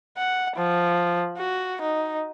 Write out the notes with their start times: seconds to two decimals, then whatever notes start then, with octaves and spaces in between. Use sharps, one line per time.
0.18 F#5
0.57 F3
1.38 F#4
1.82 D#4